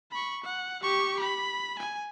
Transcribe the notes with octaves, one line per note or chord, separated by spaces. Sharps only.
B5 C#6
F#5
G4 C#6
B5
G#5